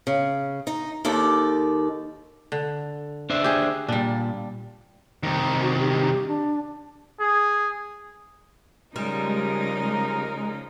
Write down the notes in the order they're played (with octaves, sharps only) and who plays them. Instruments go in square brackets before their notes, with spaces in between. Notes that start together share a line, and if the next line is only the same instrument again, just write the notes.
[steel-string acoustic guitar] C#3
D#4
D#2 D#3 A4 D5
[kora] D3
[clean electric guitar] D4 C5 E5
[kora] G4 G#4
[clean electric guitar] A#2 [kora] G3 D4
[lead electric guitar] C2 D#3
[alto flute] F#4
G4
D4
[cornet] G#4
[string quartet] C#3 F3 D#4 [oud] G3 [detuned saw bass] G#3 [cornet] A#4